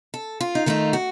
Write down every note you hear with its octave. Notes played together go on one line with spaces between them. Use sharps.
A4
F4
D#4
D#3 A3 D#4 F4
F#4